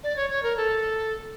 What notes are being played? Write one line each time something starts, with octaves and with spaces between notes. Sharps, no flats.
D5
C#5
C#5
A#4
A4